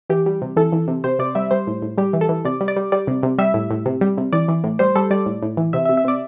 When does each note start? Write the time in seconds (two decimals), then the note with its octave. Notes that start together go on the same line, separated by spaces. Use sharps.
0.10 E3 G4
0.26 G3
0.42 C3
0.56 E3 A4
0.73 E3
0.88 C3
1.04 C3 C5
1.19 C3 D5
1.35 G3 E5
1.51 G3 C5
1.67 A2
1.82 A2
1.98 G3 G4
2.13 E3
2.21 A4
2.29 E3
2.45 C3 D5
2.61 G3
2.68 D5
2.76 G3
2.92 G3 D5
3.07 C3
3.23 C3
3.38 G3 E5
3.54 A2
3.71 A2
3.86 C3
4.01 G3
4.18 C3
4.33 E3 D5
4.48 E3
4.64 A2
4.79 G3 C5
4.96 G3 A4
5.11 G3 D5
5.26 A2
5.42 A2
5.57 E3
5.73 C3 E5
5.85 E5
5.89 C3
5.97 E5
6.04 C3 D5